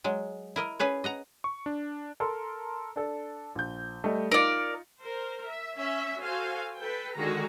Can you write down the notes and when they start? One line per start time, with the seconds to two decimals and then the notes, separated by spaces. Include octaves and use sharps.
0.04 F#3 G#3
0.56 E4 A#4 D#5
0.79 C#4 G#4 B4 C#5
1.04 D#5 F#5 A#5
1.44 C#6
1.66 D4
2.20 A4 A#4 C6
2.96 D4 A4
3.55 A#1 G6
4.04 G3 A3 D#5
4.31 D#4 F4 A#4 D5 C#7
5.00 A#4 C5
5.45 E5
5.75 C#4 E5
6.20 F#4 A4 C5 F5 G#5
6.78 A4 B4 G5
7.15 D3 D#3 G#3 F#4 G#4 A#5